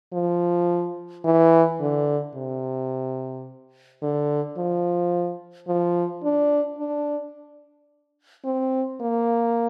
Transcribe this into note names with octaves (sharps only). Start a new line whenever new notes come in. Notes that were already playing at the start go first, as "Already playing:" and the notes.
F3
E3
D3
C3
D3
F3
F3
D4
D4
C4
A#3